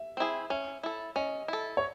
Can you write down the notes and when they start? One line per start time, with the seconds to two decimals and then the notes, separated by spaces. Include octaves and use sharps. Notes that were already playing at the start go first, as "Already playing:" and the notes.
Already playing: E5
0.17 C4 E4 G#4
0.50 C#4 E5
0.83 E4 A4
1.16 C#4 D#5
1.48 E4 A4
1.77 C#5